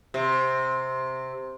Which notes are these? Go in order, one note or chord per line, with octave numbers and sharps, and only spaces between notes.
C3